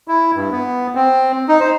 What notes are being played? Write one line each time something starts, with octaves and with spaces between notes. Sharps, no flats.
E4
G2
B3
C4
D#4
C5